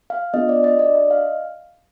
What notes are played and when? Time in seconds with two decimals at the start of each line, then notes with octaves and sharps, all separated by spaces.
0.10 F5
0.34 B3 D4 F4 G#4 D#5
0.49 D5
0.64 D#5
0.79 D4 F#4 D5
0.96 D#5
1.11 F5